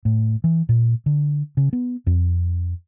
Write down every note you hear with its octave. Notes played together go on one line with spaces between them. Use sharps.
A2
E3
A#2
D3
C#3
B3
F2